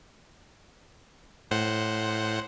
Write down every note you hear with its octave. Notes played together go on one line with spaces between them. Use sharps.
A2 C5 F#5